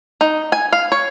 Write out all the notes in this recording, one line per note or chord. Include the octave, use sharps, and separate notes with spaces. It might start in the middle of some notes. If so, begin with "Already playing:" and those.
D#4
G#5
F5
C#5